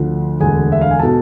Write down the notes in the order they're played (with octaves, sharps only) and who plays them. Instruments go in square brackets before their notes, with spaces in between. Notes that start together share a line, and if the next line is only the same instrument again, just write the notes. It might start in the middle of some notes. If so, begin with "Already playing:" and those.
Already playing: [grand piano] D2 D3 F3
E1 D2 D3 G#4 G#5
E5
F5
G#5
B2 A4 A5